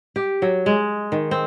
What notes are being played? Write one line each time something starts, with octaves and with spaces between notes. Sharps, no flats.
G4
F#3
G#3
D#3
C4